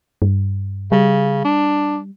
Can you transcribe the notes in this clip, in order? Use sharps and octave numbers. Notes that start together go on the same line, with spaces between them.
G2
C#3 G3
D4